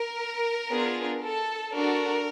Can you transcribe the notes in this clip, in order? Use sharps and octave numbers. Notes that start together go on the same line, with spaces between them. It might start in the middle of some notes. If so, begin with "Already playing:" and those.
Already playing: A#4
B3 D4 F4 G#4
A4
D4 F#4 A4 A#4